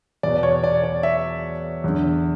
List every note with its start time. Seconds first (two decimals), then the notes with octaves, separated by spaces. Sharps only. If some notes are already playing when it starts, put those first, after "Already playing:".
0.23 E2 B2 D5
0.43 C#5
0.64 D5
0.84 D5
1.03 E5
1.84 E2 D3